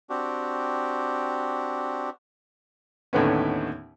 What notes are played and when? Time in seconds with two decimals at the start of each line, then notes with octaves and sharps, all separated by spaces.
0.10 C4 D4 F#4 G4
3.13 D#2 A2 D3 B3 C#4